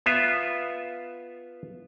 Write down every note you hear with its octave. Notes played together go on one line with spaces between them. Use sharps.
B3 F4 E5